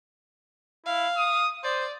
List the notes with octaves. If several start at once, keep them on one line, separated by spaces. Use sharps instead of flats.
E4 F5
D#6
C5 D5